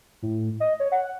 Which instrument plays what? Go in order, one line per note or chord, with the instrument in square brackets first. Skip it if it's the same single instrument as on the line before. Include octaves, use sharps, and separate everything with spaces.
[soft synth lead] A2
D#5
C#5
F#5